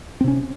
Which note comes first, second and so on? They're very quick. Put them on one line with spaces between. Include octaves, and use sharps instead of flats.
C4 C3 C#4